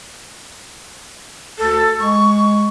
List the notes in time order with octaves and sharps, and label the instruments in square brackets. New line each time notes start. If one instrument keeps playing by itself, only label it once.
[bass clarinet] D2 [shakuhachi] A4
[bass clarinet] G#3 [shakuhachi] C#6